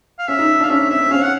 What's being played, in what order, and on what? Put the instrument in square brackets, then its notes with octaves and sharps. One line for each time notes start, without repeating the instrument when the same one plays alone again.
[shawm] F5
[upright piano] C#4 [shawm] E5
[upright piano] D#4
[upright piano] D4 [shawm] F5
[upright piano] C#4 [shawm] E5
[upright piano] C4 [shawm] E5
[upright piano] C4
[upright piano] C#4 [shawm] F5
[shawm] F#5